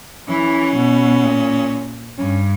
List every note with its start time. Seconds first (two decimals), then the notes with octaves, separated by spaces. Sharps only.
0.29 E3 C#4
0.76 B2
1.23 A#2
2.18 G2 C#4